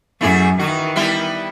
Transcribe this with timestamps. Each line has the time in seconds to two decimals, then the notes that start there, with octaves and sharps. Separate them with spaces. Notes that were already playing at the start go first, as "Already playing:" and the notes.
0.21 F#2 A3 E4 G#4
0.59 D#3 E3 F#4
0.96 G3 B3 E4